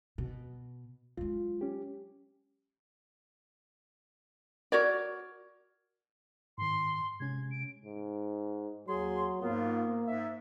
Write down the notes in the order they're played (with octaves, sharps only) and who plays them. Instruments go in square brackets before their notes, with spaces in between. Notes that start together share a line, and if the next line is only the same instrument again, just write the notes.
[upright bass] B2
[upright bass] F#3 G#3 [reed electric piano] F4
[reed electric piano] C#4 G4
[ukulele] F#4 A#4 C#5 D5
[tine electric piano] G#2 D#3 [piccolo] C6
[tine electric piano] C3 G#3 C#4 [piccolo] G#6
[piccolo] D7
[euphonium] G#2
[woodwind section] D#2 G#4 C6 [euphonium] F#3
[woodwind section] G#2 B3 F4 [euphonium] A#3
[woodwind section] G#2 E5